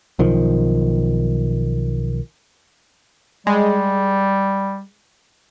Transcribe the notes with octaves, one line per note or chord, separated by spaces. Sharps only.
B1 D#3 F3
G3 G#3